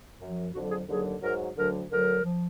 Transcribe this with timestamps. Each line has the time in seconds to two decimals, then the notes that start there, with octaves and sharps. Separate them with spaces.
0.21 F#2 F3
0.54 F2 D3 F#3 F#4
0.71 G#4
0.88 D#2 D3 F#3 G#4
1.21 G#2 F#3 A#4
1.56 D2 D3 F#3 A#4
1.90 D2 D3 F#3 A#4
2.23 F3